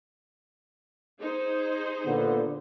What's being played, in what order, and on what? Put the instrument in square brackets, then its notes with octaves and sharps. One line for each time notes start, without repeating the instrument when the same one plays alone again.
[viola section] D#4 G#4 C5
[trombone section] A#2 D3 B3